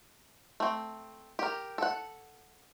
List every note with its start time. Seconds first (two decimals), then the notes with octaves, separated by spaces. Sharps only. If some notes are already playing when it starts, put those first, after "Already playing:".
0.60 A3 C4
1.39 G4 A#4
1.78 A4 F#5